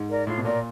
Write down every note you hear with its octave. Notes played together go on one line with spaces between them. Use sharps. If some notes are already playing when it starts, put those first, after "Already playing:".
Already playing: G#2
A#4 D5
A2 F4
B2
A#2 A#4 D5